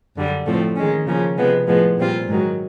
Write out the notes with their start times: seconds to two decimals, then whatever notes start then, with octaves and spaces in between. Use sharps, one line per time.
0.15 F#2 D3 G3
0.46 A2 F3 A3 C4
0.76 D#3 G#3 C#4
1.06 C#3 F3 A#3 C#4
1.37 C3 F3 G#3 B3
1.67 A2 F3 G#3 B3
1.97 A#2 G3 C4 F4
2.28 G#2 D#3 F#3